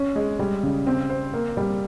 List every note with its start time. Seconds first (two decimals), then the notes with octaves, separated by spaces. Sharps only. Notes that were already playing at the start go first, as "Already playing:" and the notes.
Already playing: C#4
0.16 G#3
0.39 G3
0.63 C#3
0.87 C4
1.10 C5
1.34 A#3
1.57 G3